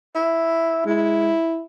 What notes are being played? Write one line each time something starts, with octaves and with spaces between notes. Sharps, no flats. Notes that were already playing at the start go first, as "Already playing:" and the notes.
E4
G#3 E4